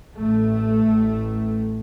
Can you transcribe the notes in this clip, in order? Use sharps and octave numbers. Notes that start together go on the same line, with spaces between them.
A1 A2 A3
A1 A2